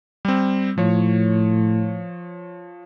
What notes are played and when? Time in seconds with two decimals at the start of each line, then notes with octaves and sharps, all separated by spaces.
0.25 G3 C4
0.78 A2 F3 C#5